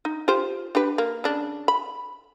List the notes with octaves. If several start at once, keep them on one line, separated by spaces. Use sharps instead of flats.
D#4
F4 G4 C5
D4 G4 B4
A#3
C#3 D4
B5